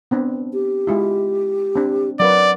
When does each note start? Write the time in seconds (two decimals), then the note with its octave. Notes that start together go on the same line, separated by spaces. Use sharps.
0.11 B3 C4 D4
0.53 G4
0.87 G#3 E4 F4
1.76 C4 D4
2.20 F#3 A#4 B4 D5 F#5